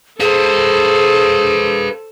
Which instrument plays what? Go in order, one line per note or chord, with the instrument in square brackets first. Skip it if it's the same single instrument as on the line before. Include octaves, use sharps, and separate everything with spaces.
[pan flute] G#4 [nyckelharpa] A4 C5 [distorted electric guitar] B4 F5